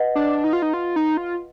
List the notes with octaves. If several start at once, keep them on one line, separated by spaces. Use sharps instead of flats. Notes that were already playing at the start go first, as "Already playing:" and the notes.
Already playing: B4 D#5 F#5
D4
D#4
F4
D#4
F4
D#4
F4